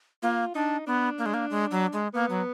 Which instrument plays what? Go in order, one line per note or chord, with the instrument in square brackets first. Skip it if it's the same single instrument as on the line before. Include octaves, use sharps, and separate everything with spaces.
[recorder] A#3 [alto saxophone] F4
[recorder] D4 [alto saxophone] D#4
[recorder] B3 [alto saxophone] D4
[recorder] A#3
G#3
A#3
G#3
F#3
G#3
[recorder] A#3 [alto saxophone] B3
[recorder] F#3